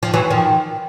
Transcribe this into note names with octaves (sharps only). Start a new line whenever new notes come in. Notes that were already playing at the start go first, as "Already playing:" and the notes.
F3
E3 F#3
D#3 F3